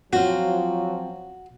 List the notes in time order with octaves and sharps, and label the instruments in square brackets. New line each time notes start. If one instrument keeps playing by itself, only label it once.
[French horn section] F3 F#3 [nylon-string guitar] C4 F4 [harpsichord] F#4